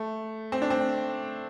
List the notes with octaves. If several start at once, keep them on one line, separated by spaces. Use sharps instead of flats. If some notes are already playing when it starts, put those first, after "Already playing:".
Already playing: A3
C4
D4
C4